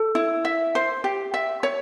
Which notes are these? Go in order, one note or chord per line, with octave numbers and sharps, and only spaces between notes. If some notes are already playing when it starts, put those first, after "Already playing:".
Already playing: A4
E4
E5
C5
G4
E5
C#5